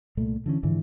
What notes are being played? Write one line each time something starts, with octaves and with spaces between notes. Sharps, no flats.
C2 A#2 A3
D3 E3 A3 C#4
G#2 D3 E3 F3